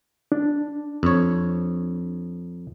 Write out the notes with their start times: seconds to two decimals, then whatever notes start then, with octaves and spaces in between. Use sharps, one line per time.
0.32 D4
1.03 F2 C#5